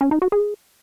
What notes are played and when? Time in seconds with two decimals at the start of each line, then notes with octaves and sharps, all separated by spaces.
0.01 C#4
0.11 D#4
0.22 F#4
0.32 G#4